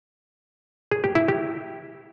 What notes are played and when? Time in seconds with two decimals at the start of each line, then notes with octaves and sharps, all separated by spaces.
0.91 G#4
1.04 G4
1.15 E4
1.28 G4